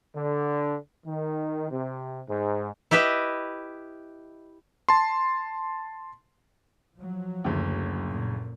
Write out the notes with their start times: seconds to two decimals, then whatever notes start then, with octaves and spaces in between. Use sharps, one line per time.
0.15 D3
1.06 D#3
1.71 C3
2.29 G#2
2.91 E4 G4 B4 D#5 E5
4.89 A5 C6
6.96 F3 F#3
7.44 F#1 D2
8.08 A#2